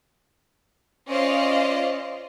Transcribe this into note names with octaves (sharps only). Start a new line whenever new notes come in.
C#4 F4 C5 D5 D#5 F5